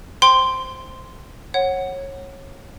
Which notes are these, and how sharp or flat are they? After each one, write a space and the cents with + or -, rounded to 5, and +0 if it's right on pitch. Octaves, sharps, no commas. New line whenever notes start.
C5 +0 G5 +0 C6 -10
C#5 -25 F#5 +5